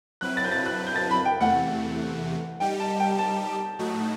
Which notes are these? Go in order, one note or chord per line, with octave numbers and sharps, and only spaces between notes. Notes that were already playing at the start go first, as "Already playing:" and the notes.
F#3 C4 E4 B4 F#6
A6
G6
A6
F#6
G6
A6
B5
G5
E2 C3 E3 A3 F#5
G3 D#4 G4 G5
A5
G5
A5
A2 F#3 A3 D#4 F#4